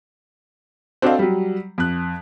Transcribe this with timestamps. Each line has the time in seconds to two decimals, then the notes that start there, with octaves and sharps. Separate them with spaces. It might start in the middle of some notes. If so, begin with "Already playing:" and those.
1.02 C4 D4 F#4 A4 D#5 F5
1.19 F#3 G3
1.78 F2 F#6